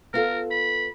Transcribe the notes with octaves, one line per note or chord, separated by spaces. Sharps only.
B3 F4 A4 A#4
B5